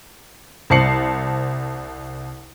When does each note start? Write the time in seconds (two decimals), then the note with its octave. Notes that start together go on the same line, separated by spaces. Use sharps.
0.70 C2 C5 A5 C7 C#7 F#7